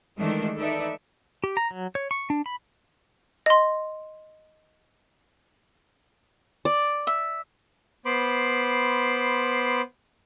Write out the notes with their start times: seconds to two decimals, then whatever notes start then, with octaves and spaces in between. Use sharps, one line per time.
0.18 D#3 E3 G#3 A3 D4
0.58 D#4 A4 B4 D5 E5
1.44 G4
1.57 A#5
1.71 F#3
1.95 C#5
2.11 C#6
2.30 D4
2.46 B5
3.46 D#5 C6
6.65 D5
7.07 E5
8.06 B3 C5 B5 C6 D6